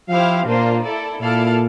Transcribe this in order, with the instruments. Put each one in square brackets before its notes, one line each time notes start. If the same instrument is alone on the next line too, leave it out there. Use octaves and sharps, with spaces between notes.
[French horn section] F3 [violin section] E4 G4 C5 F5
[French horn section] A#2 [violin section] A#3 D4 F4 C5
[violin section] E4 A4 D5
[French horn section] A#2 [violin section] E4 A4 D5 F5 A5